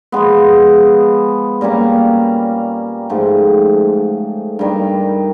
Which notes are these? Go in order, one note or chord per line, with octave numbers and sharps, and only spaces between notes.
F3 G#3 B3
A#2 G3 A#3 C#4
G#2 F3 A3
G2 D#3 G3